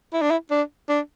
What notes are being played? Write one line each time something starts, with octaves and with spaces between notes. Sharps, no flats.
E4
D4
E4
D4
D4